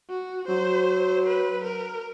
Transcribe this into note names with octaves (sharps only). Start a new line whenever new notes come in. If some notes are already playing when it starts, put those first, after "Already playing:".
F#4
F#3 C5
B4
A#4